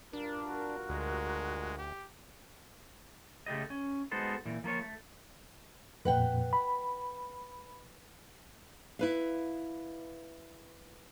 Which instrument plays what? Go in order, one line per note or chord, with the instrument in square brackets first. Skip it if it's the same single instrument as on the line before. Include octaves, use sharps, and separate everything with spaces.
[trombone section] G2 F4 A#4 [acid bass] D4
[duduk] F#4
[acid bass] D2 [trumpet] G#3
[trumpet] G4
[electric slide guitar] C#3 A3 G4 D#5
C#4
G#3 B3 D#4 F#4 A4 C5
A#2 E3
F3 A#3 F4 C#5
A3
[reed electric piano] F2 A#2 [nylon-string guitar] B4 F#5 G5
[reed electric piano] B5
[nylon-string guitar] E4 B4 F5